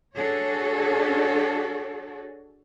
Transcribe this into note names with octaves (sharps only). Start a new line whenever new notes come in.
D4 F#4 G#4 A4 C#5